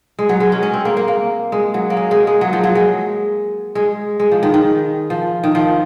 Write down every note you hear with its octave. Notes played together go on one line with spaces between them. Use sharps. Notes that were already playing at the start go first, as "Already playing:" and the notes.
G#3
F#3
G#3
C#4
C#4
C4
A#3
A#3
A#3
G#3
F#3
A#3
G#3
G#3
G#3
F#3
F3
F#3
G#3
G#3
G#3
F3
D#3
D#3
F3
D#3
F3